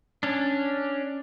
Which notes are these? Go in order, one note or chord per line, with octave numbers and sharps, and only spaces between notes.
C#4 D4